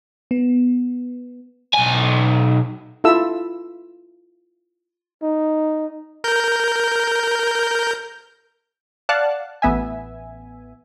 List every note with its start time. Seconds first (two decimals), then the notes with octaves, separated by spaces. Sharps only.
0.31 B3
1.73 B1 G#5
3.04 E4 F4 A4 E5 E6
5.22 D#4
6.24 A#4 G6
9.09 D5 F5 F#5 A5 F#6
9.62 A1 B3 E5 G#5